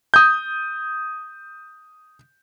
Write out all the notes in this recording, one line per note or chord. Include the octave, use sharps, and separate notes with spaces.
D#6 G6